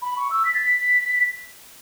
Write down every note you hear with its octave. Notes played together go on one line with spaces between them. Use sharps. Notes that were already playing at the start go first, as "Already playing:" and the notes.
B5
C#6
E6
B6
A6
B6